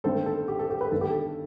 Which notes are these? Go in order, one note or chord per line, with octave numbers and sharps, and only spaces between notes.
G1 G2 D#3 A3 C4 A4 C5
A4
G4
A4
G4
B4
G1 G2 D#3 A4
G4
A4